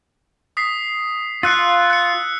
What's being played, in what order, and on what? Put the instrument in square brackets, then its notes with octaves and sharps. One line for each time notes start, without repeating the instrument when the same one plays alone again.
[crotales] D#6 B6 C7
[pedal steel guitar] F4 [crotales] E6 F#6 C#7
[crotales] F#6 C#7